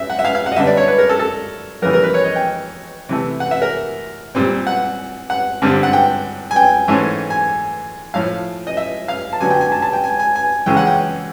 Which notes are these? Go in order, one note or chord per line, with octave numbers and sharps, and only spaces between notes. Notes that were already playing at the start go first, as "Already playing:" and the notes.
Already playing: F#2 E5
F#5
E5
F5
F5
F#5
D#5
D3 G3 B3 D4 E5
D5
C#5
B4
A#4
A4
A4
F2 C#3 E3 G3 B3 A#4
A#4
B4
C#5
D#5
G5
C3 E3 A3
F#5
E5
A#4
A#2 G3 C4
F#5
F#5
G2 D3 G3 C4
F#5
G5
G#5
G5
G#2 E3 A3 C#4
G#5
A2 F3 A3 F5
D#5
E5
F5
A5
D3 F#3 B3 D4 G#5
G5
G#5
A5
A5
G5
G#5
G#5
G#5
E2 C#3 E3 G#3 C#4 G5
F#5
G5